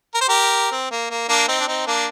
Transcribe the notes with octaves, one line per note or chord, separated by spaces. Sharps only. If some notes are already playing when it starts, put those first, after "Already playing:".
A#4
C5
G4 A#4
C4
A#3
A#3
A#3 D4
C4 D#4
D4
C4 D#4
A#3 D4